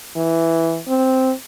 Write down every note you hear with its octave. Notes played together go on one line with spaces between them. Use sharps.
E3
C4